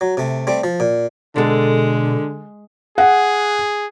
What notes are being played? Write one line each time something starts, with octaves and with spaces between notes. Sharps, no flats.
F#3
C3 A3
G3 A3 C4
F3
A#2
B2 D3 G#3 F#4 A4
G#4 F#5